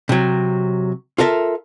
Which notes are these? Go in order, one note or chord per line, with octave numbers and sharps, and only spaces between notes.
C3 F#3
F4 A4 A#4 D#5 E5